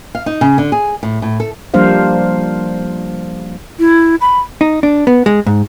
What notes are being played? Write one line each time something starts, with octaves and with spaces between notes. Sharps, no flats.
F5
D#4
C#3
D3
G#4
A2
A2
A4
F3 G3 A#3 D4 C5 F5
E4
B5
D#4
D4
B3
G#3
G#2